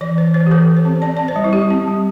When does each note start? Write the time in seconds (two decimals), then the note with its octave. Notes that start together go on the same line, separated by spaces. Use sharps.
0.01 E3 D5
0.18 E3 C5
0.34 E3 C5
0.46 G4
0.51 E3 A4
0.69 E3
0.77 C5
0.85 C4
1.02 C4 D5
1.17 C4 D5
1.28 C5
1.36 G3
1.44 E4
1.53 G3 G4
1.70 C4
1.88 G3